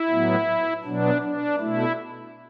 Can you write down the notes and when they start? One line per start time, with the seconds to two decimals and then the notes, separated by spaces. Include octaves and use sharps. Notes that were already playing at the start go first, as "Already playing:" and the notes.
Already playing: E4
0.09 A2 F#3 B3
0.84 B2 F#3 B3 D4
1.22 D4
1.59 B2 A3 E4